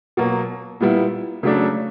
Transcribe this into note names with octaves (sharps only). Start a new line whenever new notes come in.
B2 F#3 A#3
A#2 G3 B3 E4
C#3 F#3 A3 D4